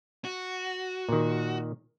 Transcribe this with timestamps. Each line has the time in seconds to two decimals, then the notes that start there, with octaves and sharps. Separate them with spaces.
0.25 F#4
1.09 A#2 D#3